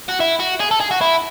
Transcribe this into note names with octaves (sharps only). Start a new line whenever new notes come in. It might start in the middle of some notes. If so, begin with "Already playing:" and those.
F#4
E4
F#4
G#4
A4
G#4
F#4
E4